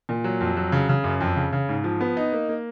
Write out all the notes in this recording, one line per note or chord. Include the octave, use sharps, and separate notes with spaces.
A#2
F#3
F2
F#3
C#3
C#3
F#2
F2
C#3
C#3
G#2
F3
B3
D#4
A#3
A#3